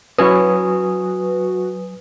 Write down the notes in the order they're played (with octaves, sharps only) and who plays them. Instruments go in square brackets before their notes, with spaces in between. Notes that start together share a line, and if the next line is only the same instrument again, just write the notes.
[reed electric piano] F#3 G#5 D#6 [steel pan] C#4 E4 C#5 [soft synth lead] F#4 [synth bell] B4